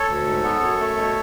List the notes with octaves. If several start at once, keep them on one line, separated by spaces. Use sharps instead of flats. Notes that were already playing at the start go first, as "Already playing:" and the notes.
Already playing: A4 C#5
D2
G#2
B3
F#2
A3
B2